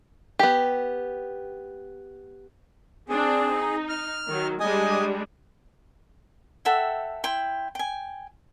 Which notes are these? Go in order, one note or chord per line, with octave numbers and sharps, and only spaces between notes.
B3 G4
C4 D4 G#4
D#4
F6
D#3 F#3
G3 G#3 D4 D#5 G#5 D#6
A4 E5 F#5 G5
E4 G5 C6
G5 G#5